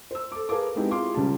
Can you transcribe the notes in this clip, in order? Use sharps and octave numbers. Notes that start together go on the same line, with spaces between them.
C5 E6
A4 D6
G#4 A#4 B4 F5 A5 D6
G#3 B3 C4 D#4 E4 G4
E4 F4 G#4 F5 C6 D6
C#2 C#3 G3 A5